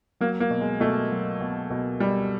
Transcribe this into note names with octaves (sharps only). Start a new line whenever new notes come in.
F#3 A#3
A#3
B2
G#3
B2 A3
F#3
B2
B2
B2 G3